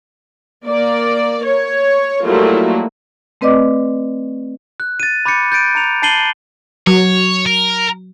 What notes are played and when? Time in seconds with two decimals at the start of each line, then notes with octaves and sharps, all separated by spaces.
0.66 A#3 D5
1.45 C#5
2.25 F#3 G3 A3 A#3 E4 F4
3.41 A3 C4 B4 D5 D#5 D6
4.80 F#6
5.00 A6 D#7
5.26 B5 D6 G6 A6 C#7
5.52 G6 A6 D7 D#7
5.75 A#5 C#7 F7
6.02 A5 A6 C7 D#7 F#7 G7
6.87 F#3 C#5
7.46 A#4